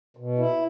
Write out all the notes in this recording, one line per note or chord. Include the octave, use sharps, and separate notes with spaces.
B2
E4